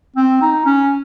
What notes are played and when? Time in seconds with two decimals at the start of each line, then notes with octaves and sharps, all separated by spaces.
0.16 C4
0.41 D#4
0.65 C#4